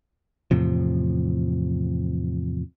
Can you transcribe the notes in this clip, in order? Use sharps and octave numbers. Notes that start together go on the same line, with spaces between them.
E2 A2 C3 F3